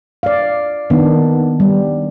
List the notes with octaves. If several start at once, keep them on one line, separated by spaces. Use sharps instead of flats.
D5 F5
D#3 B3 D4
G3